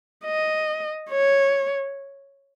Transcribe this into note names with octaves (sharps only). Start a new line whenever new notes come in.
D#5
C#5